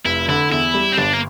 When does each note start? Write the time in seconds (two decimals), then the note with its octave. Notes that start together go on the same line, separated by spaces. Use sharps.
0.05 F1 E4
0.28 D3 E4
0.51 E2 E4
0.74 G3
0.92 C4
0.97 G1 D4
1.13 A#3